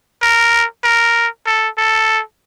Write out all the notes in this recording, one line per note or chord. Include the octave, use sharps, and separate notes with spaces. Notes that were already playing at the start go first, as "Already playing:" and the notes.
A#4
A#4
A4
A4